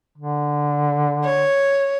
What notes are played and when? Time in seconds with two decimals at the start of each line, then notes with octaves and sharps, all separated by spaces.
0.18 D3
1.25 C#5